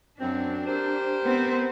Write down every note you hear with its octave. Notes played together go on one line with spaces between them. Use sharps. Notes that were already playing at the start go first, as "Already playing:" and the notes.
F#2 C4 D4
G4 A#4 C5
B3 C4